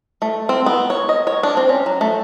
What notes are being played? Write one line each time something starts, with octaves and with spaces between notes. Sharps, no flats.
A3
C4
B3
C#5
D#5
C#5
D4
C4
C#4
F#3
A3